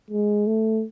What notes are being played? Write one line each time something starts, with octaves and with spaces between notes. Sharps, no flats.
G#3
A3